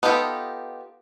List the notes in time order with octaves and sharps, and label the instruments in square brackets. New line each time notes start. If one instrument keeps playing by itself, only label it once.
[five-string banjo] B3 D#4 F4 G4 A4